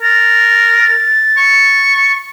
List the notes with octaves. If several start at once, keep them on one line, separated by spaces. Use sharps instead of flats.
A#4 A6
C#6